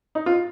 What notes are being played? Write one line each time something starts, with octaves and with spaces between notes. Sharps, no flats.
D#4
F4